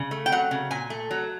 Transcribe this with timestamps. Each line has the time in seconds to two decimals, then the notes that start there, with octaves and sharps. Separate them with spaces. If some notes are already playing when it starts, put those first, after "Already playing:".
Already playing: C#3
0.11 A3
0.26 G5
0.32 F#3 F#5
0.51 C#3
0.71 A#2 G#5
0.90 A3
1.11 F#3